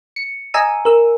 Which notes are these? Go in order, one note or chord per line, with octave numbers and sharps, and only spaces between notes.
C#7
D#5 G#5 A#5 E6 D#7
A#4 E6